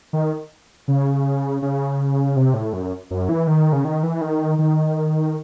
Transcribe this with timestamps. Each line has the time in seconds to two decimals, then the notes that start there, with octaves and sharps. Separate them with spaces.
0.13 D#3
0.88 C#3
1.62 C#3
2.36 C3
2.54 A2
2.73 F#2
3.11 F#2
3.29 E3
3.47 D#3
3.73 C#3
3.85 D#3
4.03 E3
4.21 D#3
4.59 D#3